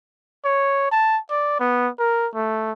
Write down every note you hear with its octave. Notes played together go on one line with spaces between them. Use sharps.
C#5
A5
D5
B3
A#4
A3